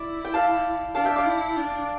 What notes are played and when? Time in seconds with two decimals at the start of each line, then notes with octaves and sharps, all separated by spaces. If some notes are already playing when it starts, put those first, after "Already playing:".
Already playing: E4 D5 E5
0.25 G5
0.34 F5 A5
0.95 D4 F5 A5
1.05 E5 G5
1.16 D5 F5
1.26 E4
1.56 D4